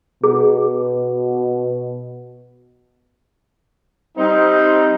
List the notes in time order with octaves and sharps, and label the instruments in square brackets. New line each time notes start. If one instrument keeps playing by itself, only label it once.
[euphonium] B2 [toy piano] G#4
[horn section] G3 C4 D#4